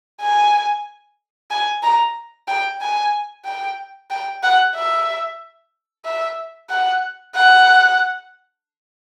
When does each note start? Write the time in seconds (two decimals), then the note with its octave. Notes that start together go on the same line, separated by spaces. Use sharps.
0.21 G#5
1.51 G#5
1.83 A#5
2.48 G5
2.81 G#5
3.45 G5
4.11 G5
4.43 F#5
4.75 E5
6.05 E5
6.70 F#5
7.35 F#5